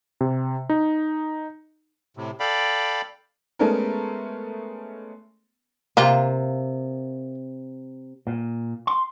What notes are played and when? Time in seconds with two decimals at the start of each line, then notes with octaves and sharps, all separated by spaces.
0.21 C3
0.70 D#4
2.17 A2 C3
2.40 A4 D5 F5 G5 B5
3.59 G#3 A3 B3 C#4 A4 A#4
5.97 C3 A#3 F4
8.27 A#2
8.87 C6